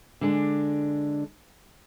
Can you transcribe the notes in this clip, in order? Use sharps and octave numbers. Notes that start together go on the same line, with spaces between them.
D3 G#3 D4